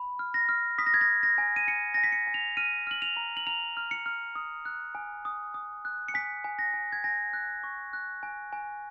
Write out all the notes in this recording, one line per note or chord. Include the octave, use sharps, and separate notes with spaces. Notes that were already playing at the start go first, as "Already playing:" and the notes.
Already playing: B5
F6
A#6
F6
D#6 B6
A#6
G#6
A#6
D#6
A#6
G#5
D#7
G#5 C#7
G#5 A#6
B6
C#7
G#5
F7
F6 D#7
F6 F#7
F7
A#5
F#7
A#5 F7
F6
C#7
F6
D#6
F#6
G#5
D#6
D#6
F#6
C#7
G#5 B6
G#5
A#6
G#5
G#6
G#5 A#6
F#6
C#6
F#6
G#5
G#5